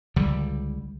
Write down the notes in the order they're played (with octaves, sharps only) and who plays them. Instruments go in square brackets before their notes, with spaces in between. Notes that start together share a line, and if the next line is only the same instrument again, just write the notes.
[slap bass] C#2 D3 G3